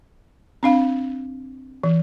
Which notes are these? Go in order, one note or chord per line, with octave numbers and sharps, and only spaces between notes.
C4 D4 F5
E3